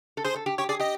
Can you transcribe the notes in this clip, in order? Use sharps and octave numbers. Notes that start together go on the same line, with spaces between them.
A4
G#4 C5
A4
G4
G4 C#5
G#4 D5
G4 D#5